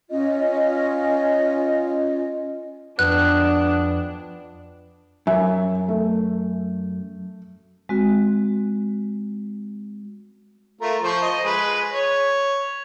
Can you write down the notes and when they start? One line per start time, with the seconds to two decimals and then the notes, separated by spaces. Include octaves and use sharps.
0.10 C#4 F4 D#5
2.99 F2 B3 D4 F#6
5.27 F#2 E5
5.88 A3
7.89 G#3 C4 F#4
10.81 A3 F4 A#4
11.03 F3 C5 C#6
11.22 D#5
11.44 G#3 B4
11.92 C#5